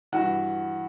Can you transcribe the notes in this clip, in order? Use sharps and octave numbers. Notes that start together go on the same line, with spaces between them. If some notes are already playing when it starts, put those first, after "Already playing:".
G2 E3 F#4